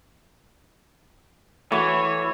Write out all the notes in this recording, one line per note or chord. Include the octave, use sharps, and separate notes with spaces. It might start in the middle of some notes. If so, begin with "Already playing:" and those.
E3 A3 F#4 C#5